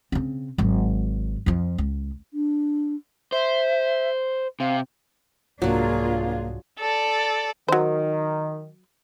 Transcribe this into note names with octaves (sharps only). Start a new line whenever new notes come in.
C#3 C4
G#1 F#3
F2 F3
C#2
D4
C5 E5
C3 F5
C2 G#2 F#3 A#3 D4 F4 F#4 G#4
A4 D5
D#3 F#3 C5